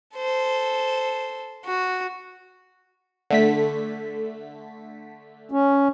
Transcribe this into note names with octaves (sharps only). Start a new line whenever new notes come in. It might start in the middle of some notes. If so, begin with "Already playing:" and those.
A4 C5
F#4
D3 A3 B6
C#4